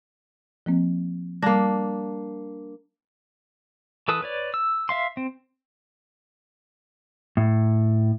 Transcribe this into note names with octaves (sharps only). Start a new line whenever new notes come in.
F3 A#3 C4
G3 A#3 D4 A#6
E3 A4 B4 D#6
B4 C#5 D5
E6
E5 F5 C6
C4
A2